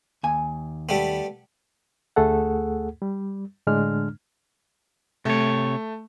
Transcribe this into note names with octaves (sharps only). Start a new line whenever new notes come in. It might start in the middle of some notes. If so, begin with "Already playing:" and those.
D#2 G#5
G3 A3 B3
D2 A3 G#4 A4 F#5
G3
A2 D3 G#3 D4 F6
C3 A3 C#5